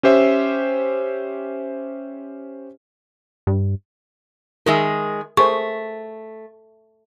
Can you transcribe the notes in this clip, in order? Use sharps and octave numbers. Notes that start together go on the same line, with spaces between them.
C#4 G4 C5 E5
G2
D#3 G#3 G#4 A#4 E5
A3 G#4 A#4 C5 C#6